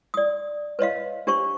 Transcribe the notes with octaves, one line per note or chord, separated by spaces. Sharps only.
D5 D#6
B4 C#5 D#5 F5
D4 G4 C5 C#6